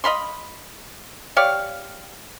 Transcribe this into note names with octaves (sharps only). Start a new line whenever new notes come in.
D#5 F5 B5 C6
G4 C#5 D5 F5